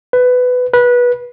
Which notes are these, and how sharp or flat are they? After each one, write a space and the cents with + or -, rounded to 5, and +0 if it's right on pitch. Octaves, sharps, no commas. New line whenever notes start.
B4 +15
B4 -20